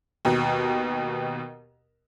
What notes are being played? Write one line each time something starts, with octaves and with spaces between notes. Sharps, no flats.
D#2 B2